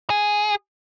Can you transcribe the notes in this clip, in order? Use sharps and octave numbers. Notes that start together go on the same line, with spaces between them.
G#4